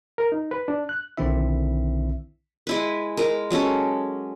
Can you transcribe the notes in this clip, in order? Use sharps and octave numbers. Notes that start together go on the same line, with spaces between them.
A#4
D#4
B4
D4
F#6
B1 D3 D#3 C4 E4 E5
G#3 E4 B4
G#3 A#4
F#3 G#3 C#4 A4